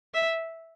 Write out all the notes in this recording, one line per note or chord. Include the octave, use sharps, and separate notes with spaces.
E5